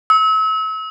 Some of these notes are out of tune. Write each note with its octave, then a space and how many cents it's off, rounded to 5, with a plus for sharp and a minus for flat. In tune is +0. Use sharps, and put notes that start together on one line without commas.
E6 -35